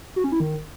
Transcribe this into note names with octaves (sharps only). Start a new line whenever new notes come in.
F#4
C#4
E4
D#3